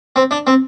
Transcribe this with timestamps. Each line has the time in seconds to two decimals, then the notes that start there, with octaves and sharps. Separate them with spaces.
0.16 C4
0.31 D4
0.47 C4